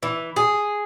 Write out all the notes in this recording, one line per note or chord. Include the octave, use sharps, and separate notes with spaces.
E3
G#4